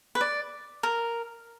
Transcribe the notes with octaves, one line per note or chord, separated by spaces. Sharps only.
B4
D5
A#4